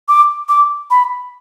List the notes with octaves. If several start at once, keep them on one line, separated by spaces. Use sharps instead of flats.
D6
D6
B5